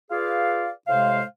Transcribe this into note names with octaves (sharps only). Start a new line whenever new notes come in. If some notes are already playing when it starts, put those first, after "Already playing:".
F4 G#4 B4 D5 F5
A2 C3 G#3 C5 F5